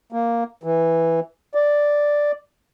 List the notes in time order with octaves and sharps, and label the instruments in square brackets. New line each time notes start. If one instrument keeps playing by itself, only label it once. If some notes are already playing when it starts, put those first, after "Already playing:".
[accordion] A#3
E3
D5